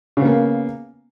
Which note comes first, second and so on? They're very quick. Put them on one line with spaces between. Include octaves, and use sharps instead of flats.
C#3 B3 A#3